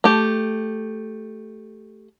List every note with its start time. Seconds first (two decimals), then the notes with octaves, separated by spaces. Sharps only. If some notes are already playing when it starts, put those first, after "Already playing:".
0.04 A3 G4